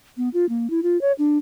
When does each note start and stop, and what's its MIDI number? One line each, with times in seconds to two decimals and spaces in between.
0.17 0.29 59
0.34 0.46 65
0.49 0.70 58
0.70 0.80 64
0.83 1.00 65
1.01 1.12 73
1.18 1.38 62